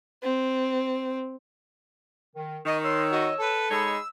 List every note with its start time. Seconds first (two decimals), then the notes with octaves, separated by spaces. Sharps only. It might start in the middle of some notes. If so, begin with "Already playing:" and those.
0.23 C4
2.36 D#3
2.66 D#3 D#5 C#6
2.83 C#5 C6 E6
3.12 F#4 D#5
3.39 A4 B4
3.71 G#3 D#4 G#4 C#5 B5 E6